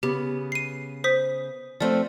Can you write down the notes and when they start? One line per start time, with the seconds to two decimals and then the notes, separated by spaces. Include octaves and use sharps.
0.03 C#3 B3 G4
0.52 C7 D#7
1.04 C5 D#6 B6
1.80 F3 A3 C4 D5